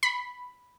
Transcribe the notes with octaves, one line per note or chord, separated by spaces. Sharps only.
B5